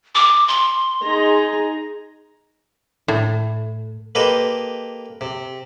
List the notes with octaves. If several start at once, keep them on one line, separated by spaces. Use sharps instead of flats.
D6
C6
D#4 G#4 A#5
A2
A#3 G4 A4 B4 C5 D#5
C3